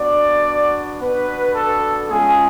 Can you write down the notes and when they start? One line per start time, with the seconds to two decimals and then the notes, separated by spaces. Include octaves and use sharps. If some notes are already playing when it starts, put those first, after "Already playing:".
Already playing: B3 D4 F#4 D5
1.01 B3 D4 F#4 B4
1.55 A4
2.09 G#3 C#4 F4 G#4